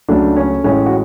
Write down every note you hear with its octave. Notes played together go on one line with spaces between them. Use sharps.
C#2 C#3 F#3 A3 D4
C#4
A1 A2 G#3 C#4
F#4